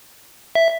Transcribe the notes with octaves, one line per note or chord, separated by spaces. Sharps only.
E5